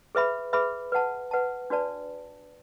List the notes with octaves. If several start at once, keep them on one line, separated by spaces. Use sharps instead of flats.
G#4 B4 E5 B5
G#4 B4 E5 B5
B4 F#5 A5
B4 F#5 A5
D4 F#4 B4 D5 A5